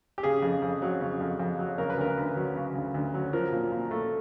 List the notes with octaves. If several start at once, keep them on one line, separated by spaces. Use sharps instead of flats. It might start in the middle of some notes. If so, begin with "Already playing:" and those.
G4
C#3 G#4
F2
F2
F#3
C#3
F2
F2
F#3
C#3 A#4
B4
D2 A#4
D2
F#3
C#3
D2
D2
F#3
F3 A#4
A#2
A#2
A3